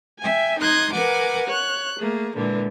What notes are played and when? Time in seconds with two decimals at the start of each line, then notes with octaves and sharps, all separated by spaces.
0.19 E5 G5 G#5
0.61 D#4 C6 D#6 F#6 G#6
0.93 A#4 B4 F#5 G#5 D6
1.47 C#5 F#6
1.99 A3 A#3 G#4
2.36 A#2 D3 E3 G#3